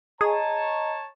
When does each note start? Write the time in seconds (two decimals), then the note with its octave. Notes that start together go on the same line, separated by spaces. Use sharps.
0.21 G#4 C#5 D#5 A5 A#5